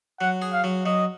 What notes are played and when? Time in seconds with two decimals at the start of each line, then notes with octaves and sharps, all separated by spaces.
0.21 F#3 F#5
0.42 G#4
0.53 F5
0.64 F#3
0.86 F#3 D#5